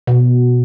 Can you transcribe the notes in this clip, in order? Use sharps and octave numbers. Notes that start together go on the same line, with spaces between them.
B2